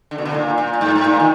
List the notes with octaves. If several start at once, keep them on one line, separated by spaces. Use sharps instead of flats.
D3
B2
D3
A#2
A#2
A#2
G#2
G#2
A#2
D#3